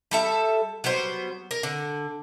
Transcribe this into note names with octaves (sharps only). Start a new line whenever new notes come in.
G3 A4 E5
F#3 G3 B3 C5
A#4
D3